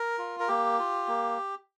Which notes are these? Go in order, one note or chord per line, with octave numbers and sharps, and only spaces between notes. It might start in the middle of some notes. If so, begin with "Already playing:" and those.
Already playing: A#4
F4
A#4
A#3 G4
F4
A#3